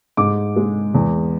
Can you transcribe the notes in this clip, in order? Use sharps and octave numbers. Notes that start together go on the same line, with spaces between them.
G#2 D6
G#3
E2